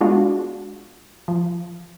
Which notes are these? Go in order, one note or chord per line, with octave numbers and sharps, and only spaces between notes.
G#3 B3 D4 F4 F#4
F3